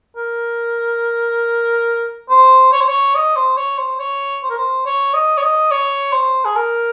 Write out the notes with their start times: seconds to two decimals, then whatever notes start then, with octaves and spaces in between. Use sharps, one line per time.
0.16 A#4
2.30 C5
2.73 C#5
2.81 C5
2.89 C#5
3.15 D#5
3.36 C5
3.57 C#5
3.78 C5
4.00 C#5
4.43 C5
4.50 A#4
4.57 C5
4.86 C#5
5.14 D#5
5.38 C#5
5.42 D#5
5.71 C#5
6.13 C5
6.45 G#4
6.56 A#4